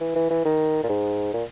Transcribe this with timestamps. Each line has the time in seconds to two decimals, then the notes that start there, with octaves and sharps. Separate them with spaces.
0.01 E3
0.15 E3
0.30 E3
0.45 D#3
0.83 A#2
0.89 G#2
1.33 A#2